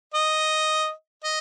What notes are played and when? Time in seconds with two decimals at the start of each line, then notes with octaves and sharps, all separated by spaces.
0.14 D#5
1.24 D#5